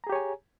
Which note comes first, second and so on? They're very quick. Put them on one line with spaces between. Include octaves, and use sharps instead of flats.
A#5 G#4 G4 C#5 G#5